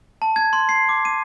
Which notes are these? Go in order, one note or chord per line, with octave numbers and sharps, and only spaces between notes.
A5
G#6
C6
C7
D6
D#7